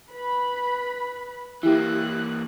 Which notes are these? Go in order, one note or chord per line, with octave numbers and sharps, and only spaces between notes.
B4 B5
E3 A#3 E4 G4 F#6